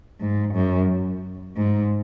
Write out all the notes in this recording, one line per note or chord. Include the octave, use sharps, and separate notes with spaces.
G#2
F#2
G#2